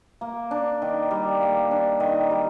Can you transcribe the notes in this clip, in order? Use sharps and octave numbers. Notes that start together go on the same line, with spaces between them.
A#3
D4
D#3
G3
A#3
D4
D#3
G3